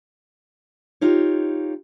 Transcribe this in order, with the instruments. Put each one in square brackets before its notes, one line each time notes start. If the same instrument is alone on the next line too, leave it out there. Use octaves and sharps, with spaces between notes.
[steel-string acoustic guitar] D#4 F4 G4 C#5